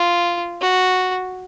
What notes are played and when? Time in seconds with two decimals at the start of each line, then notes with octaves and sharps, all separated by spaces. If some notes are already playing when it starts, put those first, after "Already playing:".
Already playing: F4
0.61 F#4